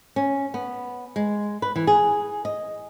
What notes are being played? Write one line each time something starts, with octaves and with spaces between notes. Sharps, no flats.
C#4
B3
G#3
B4
E3
G#4
D#5